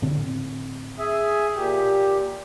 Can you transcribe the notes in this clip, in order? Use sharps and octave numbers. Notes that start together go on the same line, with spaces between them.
A2 D3 C4
G#4 E5 G#5
A#2 G4